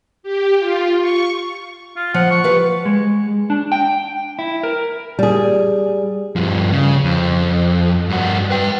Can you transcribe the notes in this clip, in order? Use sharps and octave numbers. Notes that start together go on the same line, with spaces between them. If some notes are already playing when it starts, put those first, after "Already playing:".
G4
F4
C#6
F4
F3 F#5
C#6
G4 B4 F5
G#3
D4
G5
E4
A#4
G3 G#4
G2 F3
C#3
F2
G2 F#4
B4 G5